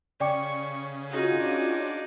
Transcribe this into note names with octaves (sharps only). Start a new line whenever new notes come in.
C#3 D5 G5 C#6 D6
C#4 D#4 F4 F#4 G#4
D4